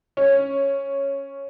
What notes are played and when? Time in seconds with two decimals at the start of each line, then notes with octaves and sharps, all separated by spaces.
0.17 C#4